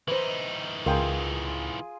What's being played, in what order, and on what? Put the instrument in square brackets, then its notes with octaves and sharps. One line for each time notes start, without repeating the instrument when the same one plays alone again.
[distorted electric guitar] E3 D#4 [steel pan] B4 C5
[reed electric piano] C#2 [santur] F4 G#4 C6 [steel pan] A#4 G5